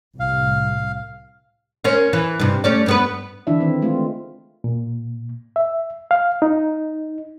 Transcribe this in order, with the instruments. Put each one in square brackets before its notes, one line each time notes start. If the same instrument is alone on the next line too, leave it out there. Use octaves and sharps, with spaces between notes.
[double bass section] C2 A2 [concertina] F5
[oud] C#4 A#4 C5
E3
G2 C3
A3 C#4 D5
G2 B3 B4
[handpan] D3 E3 D4 E4 E5
D#3 C4
G#3 A3 C4 F4
[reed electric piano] A#2
E5
F5
D#4